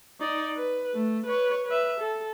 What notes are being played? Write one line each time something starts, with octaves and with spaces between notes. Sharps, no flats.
D#4 D5
B4
A3
B4 C#5
B4 E5
A4